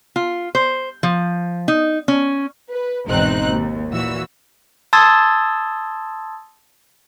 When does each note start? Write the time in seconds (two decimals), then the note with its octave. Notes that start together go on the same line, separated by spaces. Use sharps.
0.16 F4
0.55 C5
1.03 F3
1.68 D#4
2.08 C#4
2.70 B4
3.07 G#1 E2 B2 C4 D#4 F#6
3.50 D#2
3.91 A#2 E3 F#4 E6
4.93 A5 C6 D#6 E6 G#6 A6